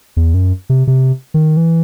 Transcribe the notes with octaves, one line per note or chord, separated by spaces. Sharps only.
E2
F#2
C3
C3
D#3
E3